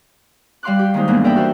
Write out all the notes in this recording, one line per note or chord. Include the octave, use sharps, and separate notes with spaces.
G3 F5 C6 D6 F#6
G4
D#3 G#3 A#3 D#4 C5
D#2 G#2 E3 A#3 B3 D4
A#4 D5 E5 G5 A5 B5
F#4 A4 A#4 C5